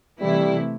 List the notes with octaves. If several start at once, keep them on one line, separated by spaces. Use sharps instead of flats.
C3 E3 G3 A3 E4